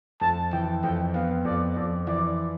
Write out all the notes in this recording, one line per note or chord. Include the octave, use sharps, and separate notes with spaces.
F2 A5
E3 G5
F2 G5
B3 F5
F2 D5
F2 D5
E3 D5